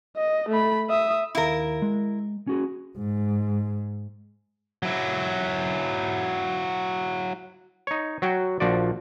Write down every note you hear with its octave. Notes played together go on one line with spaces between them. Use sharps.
D#5
A3 B5
E5 D#6
D#2 E4 A#4 F5 B5
G#3
C#4 F#4 G#4
G#2
F#3 E4
D#4 C#5
F#3 F#4 G5
A#1 F3 F#4 D5